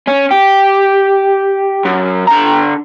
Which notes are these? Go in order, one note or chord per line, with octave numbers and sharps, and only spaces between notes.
C#4
G4
F#2
D3 A#5